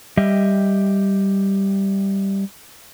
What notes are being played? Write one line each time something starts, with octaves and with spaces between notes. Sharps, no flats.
G3 G4 D#5 E5